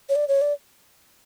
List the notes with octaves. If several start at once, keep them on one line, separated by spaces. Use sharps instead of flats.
C#5
D5
C#5
D5